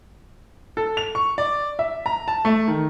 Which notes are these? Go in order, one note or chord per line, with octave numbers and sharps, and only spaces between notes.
A4
F7
C#6
D5
E5
A#5
A5
A3
D#3